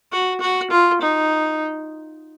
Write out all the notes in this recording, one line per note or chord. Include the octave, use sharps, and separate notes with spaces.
F#4
F#4
F4
D#4